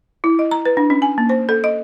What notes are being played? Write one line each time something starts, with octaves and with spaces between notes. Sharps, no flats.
E4
D#5
A#5
B4
D4
C#4
G#5
A#3
C5
A4
D#5